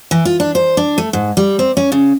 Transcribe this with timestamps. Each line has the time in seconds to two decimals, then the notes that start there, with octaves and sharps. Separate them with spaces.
0.11 E3
0.25 F4
0.40 D4
0.55 C5
0.77 D4
0.98 A3
1.13 G#2
1.37 G3
1.59 C4
1.77 C#4
1.92 C#3